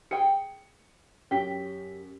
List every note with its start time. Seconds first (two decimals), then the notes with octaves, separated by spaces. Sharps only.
0.11 G#4 G5 C#7
1.31 F#2 C#4 G4 B6